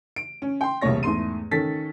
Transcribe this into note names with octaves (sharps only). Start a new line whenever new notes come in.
D7
C#4
G5 C6
E1 C2 A3 A#3 C#5 A#6
E2 G#2 A3 C6 D#7
D#3 C#4 A4 A6 B6